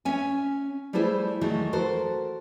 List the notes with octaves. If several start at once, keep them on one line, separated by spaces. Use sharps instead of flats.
C#4 C#5 E5 G#5
G3 A3 E4 G#4 C5 E5
D#3 E3 F#3 G#3 A3
F#4 A4 A#4 C5